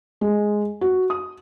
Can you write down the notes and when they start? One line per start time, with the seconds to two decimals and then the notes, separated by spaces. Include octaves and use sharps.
0.21 G#3
0.81 F#4
1.10 D#6